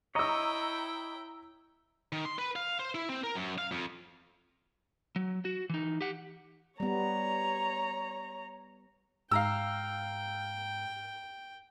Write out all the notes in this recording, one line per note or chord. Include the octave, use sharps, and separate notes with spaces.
E4 C#5 D#5 G5 A#5 E6
D#3
C6
B4
F5
C5
E4
C4
A#4
F#2
F5
F2
F#3
F#4
E3 D#4
G4 F#5
G3 B3 C#5 A#5
G#2 F5 G5 A#5 E6